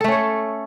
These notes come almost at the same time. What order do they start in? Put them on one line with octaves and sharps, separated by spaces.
A4 A3 C#4 C#5